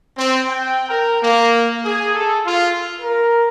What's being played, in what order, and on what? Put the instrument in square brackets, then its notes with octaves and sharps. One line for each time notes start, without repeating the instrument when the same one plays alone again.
[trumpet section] C4
G5
A#4
A#3
G#4
A4
F4
[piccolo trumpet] A#4